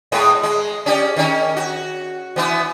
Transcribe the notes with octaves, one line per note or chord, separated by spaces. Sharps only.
A2 G#3 B3
G#3
C#4 G4 D5
D#3 C#4
F#4
E3 B3 E4